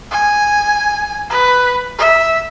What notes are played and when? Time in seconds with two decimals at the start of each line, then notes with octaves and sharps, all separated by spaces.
0.11 G#5
1.30 B4
1.98 E5